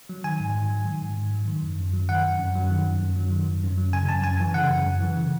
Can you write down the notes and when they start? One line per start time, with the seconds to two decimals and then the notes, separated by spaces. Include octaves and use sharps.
0.09 F#3
0.24 D#3 G#5
0.40 G#2
0.55 G#2
0.70 F#3
0.86 D#3
1.01 G#2
1.16 G#2
1.32 F#3
1.48 D#3
1.63 F#2
1.79 F#2
1.93 F#3
2.09 D#3 F#5
2.24 F#2
2.39 F#2
2.55 F#3
2.71 D#3
2.86 F#2
3.01 F#2
3.16 F#3
3.32 D#3
3.48 F#2
3.63 F#2
3.78 F#3
3.93 C#3 G#5
4.09 F#2 A5
4.24 F#2 G#5
4.40 E3
4.54 C#3 F#5
4.70 F#2
4.86 F#2
5.01 E3
5.17 C#3